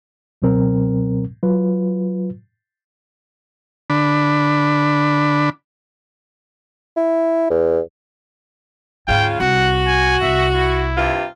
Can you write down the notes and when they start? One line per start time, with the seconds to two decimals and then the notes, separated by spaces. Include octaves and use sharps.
0.42 C#2 B2 F#3 C4 A#4
1.43 F#3 F4 B4
3.90 D3 D4 B5
6.97 E4
7.50 E2
9.08 D2 G#2 C#3 F4 G5
9.40 C2 F#4 F#5
9.87 G#5
10.22 C2 E5
10.54 E4
10.96 G2 C3 F4